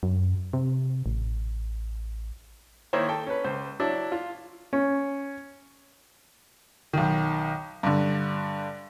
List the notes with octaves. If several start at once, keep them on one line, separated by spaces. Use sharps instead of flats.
F#2
C3
A1
D#3 A#3 E4 C5 C#5
A4 G5
C#4 B4
C#2 C5
F#3 D4 E4
F4
C#4
B1 D#3
G2 D3